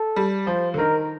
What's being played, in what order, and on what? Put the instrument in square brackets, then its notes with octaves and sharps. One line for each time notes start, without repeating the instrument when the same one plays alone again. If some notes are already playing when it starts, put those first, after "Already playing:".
Already playing: [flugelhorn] A4
[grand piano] G3
[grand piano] F3 [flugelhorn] C5
[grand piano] D3
[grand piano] D#3 [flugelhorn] A#4